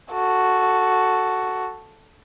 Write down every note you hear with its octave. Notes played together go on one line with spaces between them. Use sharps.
F#4 A4